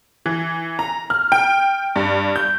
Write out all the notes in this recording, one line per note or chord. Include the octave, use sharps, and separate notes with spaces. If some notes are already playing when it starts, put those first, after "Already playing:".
E3
A#5
F6
G5
G2
G6